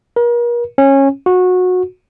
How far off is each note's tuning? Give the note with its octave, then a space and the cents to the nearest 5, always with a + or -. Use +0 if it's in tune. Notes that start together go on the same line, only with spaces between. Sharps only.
A#4 +40
C#4 -20
F#4 -20